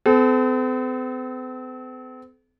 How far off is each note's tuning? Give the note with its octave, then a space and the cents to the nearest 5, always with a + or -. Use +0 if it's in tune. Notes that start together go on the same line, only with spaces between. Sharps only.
C4 -45 A4 -40